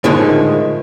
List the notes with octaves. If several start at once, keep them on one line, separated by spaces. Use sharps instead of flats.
A2 D3 D#3 F3 G#3